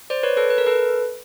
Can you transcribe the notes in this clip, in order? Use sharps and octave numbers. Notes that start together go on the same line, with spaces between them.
C5 D5
B4 C#5
A4 B4
B4
A#4
A4 B4